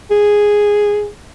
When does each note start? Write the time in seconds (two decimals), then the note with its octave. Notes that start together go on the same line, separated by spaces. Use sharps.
0.11 G#4